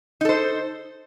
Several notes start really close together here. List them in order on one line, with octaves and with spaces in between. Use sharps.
D#4 A4 C5